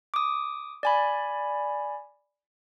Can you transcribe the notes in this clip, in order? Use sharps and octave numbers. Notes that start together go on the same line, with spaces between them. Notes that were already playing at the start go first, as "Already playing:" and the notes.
D6 D#6
D5 G#5 B5